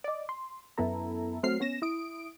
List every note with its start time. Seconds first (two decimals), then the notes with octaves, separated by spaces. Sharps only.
0.04 D5 D#5
0.29 C6
0.78 F#2 B3 E4 A4 A#5
1.43 F#3 A3 C4 C5 F6 C7
1.60 B3 C#4 A#6 E7
1.82 E4 D#6 D7